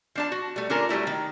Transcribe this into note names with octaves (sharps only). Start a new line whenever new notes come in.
F3 D4 A5
F#4
G3 A3
D3 C#4 D4 F4 A#4
F#3 G3 A3 E4
D#3